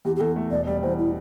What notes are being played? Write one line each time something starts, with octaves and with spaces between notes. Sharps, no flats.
E2 G4
G4
E2 A4
A3
E1 D5
G3 D5
E2 C5
E4